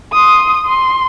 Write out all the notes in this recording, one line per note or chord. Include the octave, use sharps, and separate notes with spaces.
C6 D#6
C6